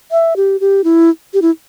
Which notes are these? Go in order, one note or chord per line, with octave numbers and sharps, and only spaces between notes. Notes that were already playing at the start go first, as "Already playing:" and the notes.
E5
G4
G4
E4
G4
E4